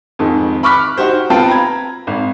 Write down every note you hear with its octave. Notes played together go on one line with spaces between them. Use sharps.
F2 G#2 D#3
B5 C#6 D6 F6 F#6 B6
D#4 F#4 G4 C5
B3 C4 F4 G5 A5
A#5 B5 G#6
G#1